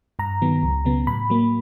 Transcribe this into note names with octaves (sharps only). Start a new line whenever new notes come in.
G2 A#5
D#3 F#3 B3
C#2
C#3 F#3 B3
A2 B5
F#3 A#3